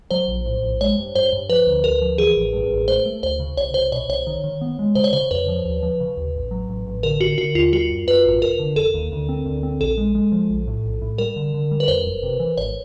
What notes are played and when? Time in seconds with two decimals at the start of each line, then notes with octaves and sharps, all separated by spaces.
0.11 F#3 C5
0.28 A#1
0.45 A2
0.63 A#1
0.81 G#3 C#5
0.98 G2
1.15 G2 C5
1.33 G2
1.49 F3 B4
1.67 D2
1.84 D2 A#4
2.01 F3
2.18 E3 G#4
2.36 A1
2.53 G2
2.71 A1
2.88 A3 C5
3.06 A3
3.23 D2 C5
3.40 C#3
3.57 C2 C#5
3.74 C2 C5
3.92 B2 C#5
4.09 C2 C#5
4.27 D#3
4.44 D#3
4.61 B3
4.79 G#3
4.95 C#3 C5
5.04 C#5
5.13 C#3 C5
5.31 F2 B4
5.48 F3
5.65 D#2
5.83 F3
6.00 C#3
6.17 D#2
6.35 A1
6.51 F#3
6.69 A1
6.86 A1
7.03 D3 A#4
7.21 D3 F#4
7.38 D3 F#4
7.55 D#2 F4
7.72 G3 F#4
7.90 F#2
8.07 F#2 B4
8.25 G#1
8.42 F1 A#4
8.59 D3
8.76 F1 A4
8.94 D#2
9.12 D2
9.29 C4
9.45 D2
9.63 C4
9.80 A#1 A4
9.98 G#3
10.15 G#3
10.32 F3
10.50 A#1
10.67 A2
10.85 A#1
11.02 A2
11.18 G3 A#4
11.36 D3
11.54 D3
11.71 G3
11.80 B4
11.88 F2 C5
12.06 F#1
12.23 C3
12.40 E3
12.57 G#1 C#5